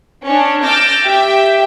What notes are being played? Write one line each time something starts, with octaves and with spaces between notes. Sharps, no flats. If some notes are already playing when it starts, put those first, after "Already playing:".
C#4 D4
D6 E6 F6 G6 A6 A#6
G4 E5 G5